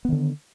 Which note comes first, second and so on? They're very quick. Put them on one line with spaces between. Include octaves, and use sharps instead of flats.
B3 D#3 D3